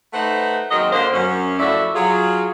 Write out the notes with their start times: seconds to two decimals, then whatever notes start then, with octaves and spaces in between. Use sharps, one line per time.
0.13 A3 D#4 B4 C5 F#5
0.71 D#2 F#3 G#3 C4 A#4 D#5
0.92 D3 A#3 C5
1.13 F#2 C#4
1.59 A2 F3 E4 F#4 A4 D5
1.95 F#3 F4 G#4